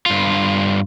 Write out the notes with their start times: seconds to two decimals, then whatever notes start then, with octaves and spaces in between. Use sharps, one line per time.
0.06 G2 F4